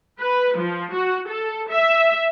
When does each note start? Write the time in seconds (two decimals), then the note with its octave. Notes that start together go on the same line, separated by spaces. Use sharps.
0.19 B4
0.58 F3
0.95 F#4
1.29 A4
1.70 E5